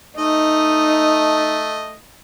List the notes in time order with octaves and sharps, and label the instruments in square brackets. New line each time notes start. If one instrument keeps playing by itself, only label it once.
[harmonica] A3 D#5 [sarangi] D#4